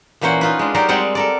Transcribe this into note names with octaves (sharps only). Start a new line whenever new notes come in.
A#2 E3 A#3 C#4 C5 F#5
D#4 F4 B4
G#3 D4
F#3 D#4 G4 A#4 C5 D5
G3 G#3 C4 G#4 D5 F#5
A4 A#4 D5